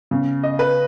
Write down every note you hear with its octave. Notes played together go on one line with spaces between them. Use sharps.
C#3 B3
D#5
B4